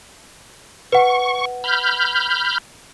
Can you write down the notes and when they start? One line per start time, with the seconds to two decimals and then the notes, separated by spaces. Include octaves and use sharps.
0.92 B4 F#5 C#6
1.64 B5 F6 G6